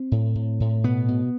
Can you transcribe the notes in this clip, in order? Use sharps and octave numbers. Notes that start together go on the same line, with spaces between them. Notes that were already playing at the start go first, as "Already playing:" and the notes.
Already playing: C4
A2
A2
A2
B2 B3
B2